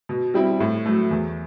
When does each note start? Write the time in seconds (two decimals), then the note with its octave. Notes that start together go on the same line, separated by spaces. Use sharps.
0.09 B2
0.34 G3 C4 E4
0.60 A2
0.86 F#3 A3
1.11 E2